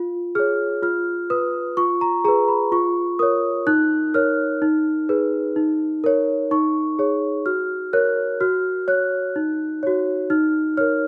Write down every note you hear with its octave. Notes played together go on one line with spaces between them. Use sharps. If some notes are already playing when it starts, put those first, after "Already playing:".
Already playing: F4
G#4 C#5 F6
F4 F6
B4 D#6
F4 C#6
A#5
G#4 B4 A#5
B5
F4 C#6
A#4 C#5 D#6
D#4 F#6
A#4 C#5 F6
D#4
G#4 B4
D#4
A#4 C#5
D#4 C#6
G#4 C#5
F#4 F6
A#4 C#5 F#6
F#4 F6
C#5 F#6
D#4
F#4 C#5
D#4 F6
A#4 C#5 F6